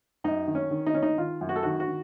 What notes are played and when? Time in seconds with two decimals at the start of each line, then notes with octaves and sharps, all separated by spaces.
0.24 F#2 D#4
0.47 D#3
0.55 C#4
0.71 D#3
0.86 D#4
0.94 D#3 C#4
1.02 D#4
1.18 D#3 F4
1.41 F#2
1.49 F#4
1.56 A4
1.63 D#3 F#4
1.80 F#4
1.87 D#3